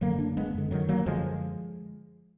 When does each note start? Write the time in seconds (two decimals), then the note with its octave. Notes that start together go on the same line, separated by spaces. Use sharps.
0.01 F#2 D3 F#3 A#3
0.19 A#3 D4
0.37 G#3 B3
0.54 F#2 D3
0.71 D#3 F#3
0.89 F#3 A#3
1.06 F#2 D3 F3 G#3